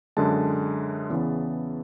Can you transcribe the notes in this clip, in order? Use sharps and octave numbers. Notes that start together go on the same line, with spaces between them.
F#2 D3 G#3 A5
E2 C#3 E3 B3